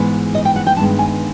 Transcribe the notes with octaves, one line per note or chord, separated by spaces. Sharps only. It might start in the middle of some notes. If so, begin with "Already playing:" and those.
Already playing: G#2 E3 G#3 B3
D#5
G5
F#5
G5
G2 D#3 G#3 B3 A5
G#5